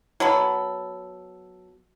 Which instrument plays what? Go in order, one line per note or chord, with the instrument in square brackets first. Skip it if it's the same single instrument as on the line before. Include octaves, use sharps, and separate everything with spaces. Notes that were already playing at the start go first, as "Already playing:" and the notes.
[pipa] F#3 B3 A4 B5